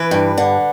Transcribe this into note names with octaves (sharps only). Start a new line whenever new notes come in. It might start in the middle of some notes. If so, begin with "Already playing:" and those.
Already playing: E3 B4
G2
D3